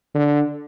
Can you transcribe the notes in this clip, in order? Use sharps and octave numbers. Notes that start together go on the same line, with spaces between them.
D3